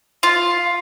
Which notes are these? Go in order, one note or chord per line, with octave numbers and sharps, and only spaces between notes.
F4